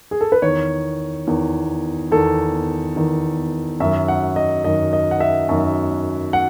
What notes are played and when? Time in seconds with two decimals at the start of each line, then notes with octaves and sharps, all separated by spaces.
0.11 G#4
0.21 A4
0.32 B4
0.42 E2 D#3 C#5
1.27 E2 D#3
2.11 E2 D#3 A4
2.96 E2 D#3
3.80 F#2 D#3 E5
4.08 F#5
4.36 D#5
4.64 F#2 D#3 D#5
4.93 D#5
5.11 F#5
5.20 E5
5.49 F#2 D#3
6.33 F#5